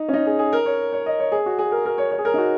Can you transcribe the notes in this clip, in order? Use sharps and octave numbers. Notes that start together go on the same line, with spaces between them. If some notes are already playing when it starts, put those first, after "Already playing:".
Already playing: D#4
C#4
D#4
G#4
G#4
A#4
C#5
C#5
D#5
C#5
G#4
F#4
G#4
A#4
A#4
C#5
C#5
G#4
A#4
D#4
F#4